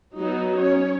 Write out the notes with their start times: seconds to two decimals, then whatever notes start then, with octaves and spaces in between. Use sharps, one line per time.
0.17 F#3 B3 D#4 F#4
0.58 C#4 C#5